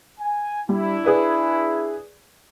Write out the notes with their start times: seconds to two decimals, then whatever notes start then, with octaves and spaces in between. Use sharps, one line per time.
0.20 G#5
0.69 G3 D4 E4
1.05 G#4 B4 D5